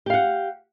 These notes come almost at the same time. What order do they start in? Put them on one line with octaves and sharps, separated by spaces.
G4 F5 F#5